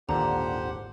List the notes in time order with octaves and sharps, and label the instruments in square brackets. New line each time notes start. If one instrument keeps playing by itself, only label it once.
[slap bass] G#1 D#2 [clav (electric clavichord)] A#2 D3 [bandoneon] G4 C5 F#5 [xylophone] A#5